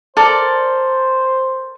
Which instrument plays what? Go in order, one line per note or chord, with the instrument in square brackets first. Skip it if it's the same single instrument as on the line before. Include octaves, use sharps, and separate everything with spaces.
[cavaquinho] A4 A#4 D5 [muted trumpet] C5